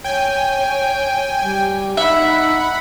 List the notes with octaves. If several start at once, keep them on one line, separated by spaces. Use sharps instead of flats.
C#5 G5 G#5
G3
D#4 E5 F#5 B5